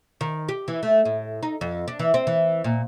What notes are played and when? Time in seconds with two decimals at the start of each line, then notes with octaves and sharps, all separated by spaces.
0.21 D#3
0.49 G4
0.68 E3
0.83 A3
1.05 A2
1.43 D#4
1.61 F2
1.88 D4
1.99 E3
2.14 C4
2.27 E3
2.64 A#2